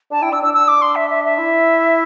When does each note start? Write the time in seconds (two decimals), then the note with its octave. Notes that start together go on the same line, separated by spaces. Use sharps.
0.10 D4 A5
0.22 E4 G5
0.32 D4 E6
0.42 D4 E6
0.53 E6
0.68 D6
0.81 C6
0.95 E5
1.10 E5
1.24 E5
1.38 E4